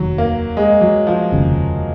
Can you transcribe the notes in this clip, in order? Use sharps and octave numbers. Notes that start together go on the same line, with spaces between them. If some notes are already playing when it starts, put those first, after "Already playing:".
Already playing: F1 D#2 D#3 F#3
A#3
G#3
F#3
F3
F1 D#2 C#3